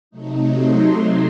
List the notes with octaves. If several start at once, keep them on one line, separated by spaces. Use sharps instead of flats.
C3 F#3 A3 D#4
C6